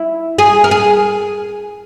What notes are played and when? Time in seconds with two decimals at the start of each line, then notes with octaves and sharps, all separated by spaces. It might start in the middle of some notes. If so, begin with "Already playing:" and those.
Already playing: E4
0.38 G#4
0.64 A#4
0.71 G#4